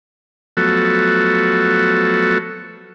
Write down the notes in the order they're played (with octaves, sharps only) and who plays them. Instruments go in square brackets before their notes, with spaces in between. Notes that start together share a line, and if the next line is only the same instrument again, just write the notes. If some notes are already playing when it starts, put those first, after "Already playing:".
[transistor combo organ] F3 F#3 A3 B3 F#4 A4